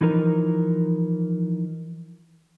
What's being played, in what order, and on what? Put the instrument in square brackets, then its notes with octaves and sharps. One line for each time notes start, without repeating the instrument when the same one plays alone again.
[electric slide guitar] E3 F3 D#4 A#4